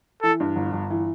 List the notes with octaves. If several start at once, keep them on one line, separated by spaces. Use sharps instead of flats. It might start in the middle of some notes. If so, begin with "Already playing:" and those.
E3 A4
G2
G1
G1
E3